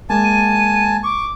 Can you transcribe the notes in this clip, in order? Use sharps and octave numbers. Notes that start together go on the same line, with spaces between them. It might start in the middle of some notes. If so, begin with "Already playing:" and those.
G#3 A#3 G#5 A5
D#7
C#6 D6